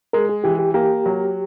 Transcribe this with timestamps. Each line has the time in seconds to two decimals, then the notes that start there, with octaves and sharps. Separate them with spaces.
0.13 G#3 A#4
0.29 G#4
0.44 E3 G4
0.59 G4
0.74 A#3 G4
1.06 F#3